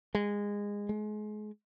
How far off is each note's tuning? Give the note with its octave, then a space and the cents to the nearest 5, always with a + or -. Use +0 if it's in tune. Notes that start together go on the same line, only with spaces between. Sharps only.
G#3 -20
G#3 +30